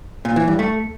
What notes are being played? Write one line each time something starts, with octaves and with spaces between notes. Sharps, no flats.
A#2
E3
G2
A3